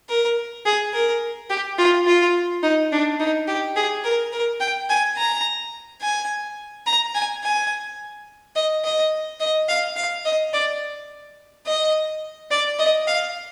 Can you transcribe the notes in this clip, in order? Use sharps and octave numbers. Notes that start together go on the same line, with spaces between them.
A#4
G#4
A#4
G4
F4
F4
D#4
D4
D#4
G4
G#4
A#4
A#4
G5
G#5
A#5
G#5
A#5
G#5
G#5
D#5
D#5
D#5
F5
F5
D#5
D5
D#5
D5
D#5
F5